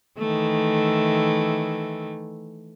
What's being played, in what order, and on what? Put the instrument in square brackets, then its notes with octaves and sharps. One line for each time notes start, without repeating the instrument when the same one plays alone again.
[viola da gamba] D#3 E3 A3